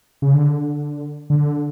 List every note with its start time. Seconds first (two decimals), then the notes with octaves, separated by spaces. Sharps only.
0.22 C#3
0.34 D3
1.30 D3